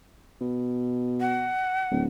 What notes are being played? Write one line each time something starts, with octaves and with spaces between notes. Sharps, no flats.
B2
F#5
D1